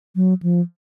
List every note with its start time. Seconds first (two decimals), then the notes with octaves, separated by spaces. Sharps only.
0.16 F#3
0.43 F3